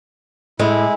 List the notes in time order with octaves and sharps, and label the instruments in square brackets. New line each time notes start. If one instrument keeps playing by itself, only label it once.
[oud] A2 [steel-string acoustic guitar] G#3 [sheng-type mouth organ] E4